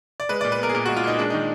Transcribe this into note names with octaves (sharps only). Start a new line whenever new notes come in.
D5
G#3 B4
A#2 D5
B4
B3 A#4
G#4
A#2 A#4
G#3 F#4
F4
A#2 D#4
G#3 D4
D#3 D#4